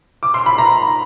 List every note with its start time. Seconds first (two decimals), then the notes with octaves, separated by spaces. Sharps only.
0.23 D6
0.34 C6
0.46 B5
0.58 A#5